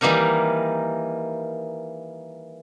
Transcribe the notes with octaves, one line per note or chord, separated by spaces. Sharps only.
D#3 E3 G3 A#3 D#4 A#4